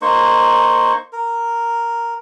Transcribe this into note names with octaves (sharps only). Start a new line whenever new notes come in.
A#3 D#4 C5 C#6
A#4